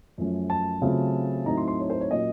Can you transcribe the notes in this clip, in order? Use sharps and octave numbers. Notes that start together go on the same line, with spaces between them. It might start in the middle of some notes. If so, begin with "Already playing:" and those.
F#2 F3 A3 C#4
A5
C#3 F#3 A3 C4 F4
A2 F#3 A3 C4 D#4 A#5
C6
C6
C#5
C5
C#5
A#2 F#3 A#3 C#4 D#5